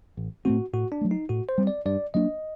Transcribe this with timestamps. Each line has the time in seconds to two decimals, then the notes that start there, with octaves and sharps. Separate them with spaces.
0.17 A1
0.45 A2 A3 C4 F#4
0.73 A2 F#4
0.92 D4
1.01 F#3 A3
1.11 D#4
1.29 A2 F#4
1.49 C5
1.58 G3 C4
1.67 D5
1.85 G2 D5
2.14 F#3 A#3 D4 D#5